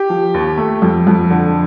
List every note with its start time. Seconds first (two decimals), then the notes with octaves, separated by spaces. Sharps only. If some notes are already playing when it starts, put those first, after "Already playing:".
Already playing: G4
0.09 F3
0.34 D#2
0.57 A3
0.82 F2
1.07 F2
1.30 D3